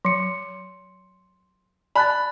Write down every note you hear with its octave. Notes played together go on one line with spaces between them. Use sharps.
F#3 C6 C#7
D5 G#5 A5 B5 F#6 A6